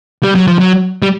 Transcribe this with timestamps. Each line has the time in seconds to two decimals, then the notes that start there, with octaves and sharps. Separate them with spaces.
0.23 G3
0.35 F#3
0.47 F3
0.59 F#3
1.02 G3